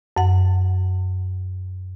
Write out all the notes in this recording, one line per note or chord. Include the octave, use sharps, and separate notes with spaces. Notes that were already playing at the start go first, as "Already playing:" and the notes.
F#2 F#5